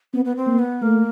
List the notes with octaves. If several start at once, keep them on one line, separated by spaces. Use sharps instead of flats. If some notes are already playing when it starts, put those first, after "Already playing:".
B3 C4
B3
C4
A#3
B3
A3 A#3